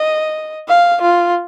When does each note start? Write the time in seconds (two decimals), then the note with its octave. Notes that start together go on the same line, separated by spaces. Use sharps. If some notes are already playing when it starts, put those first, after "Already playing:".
Already playing: D#5
0.68 F5
1.01 F4